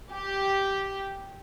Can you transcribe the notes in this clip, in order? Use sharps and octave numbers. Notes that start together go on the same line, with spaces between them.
G4